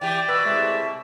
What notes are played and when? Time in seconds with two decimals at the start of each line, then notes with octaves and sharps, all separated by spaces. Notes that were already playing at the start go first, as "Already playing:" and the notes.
0.01 E3 G4 D5 G5
0.28 B2 F#4 B4 E6
0.45 A2 C3 G#3 E5